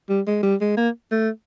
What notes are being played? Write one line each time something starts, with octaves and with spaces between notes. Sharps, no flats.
G3
G#3
G3
G#3
A#3
A3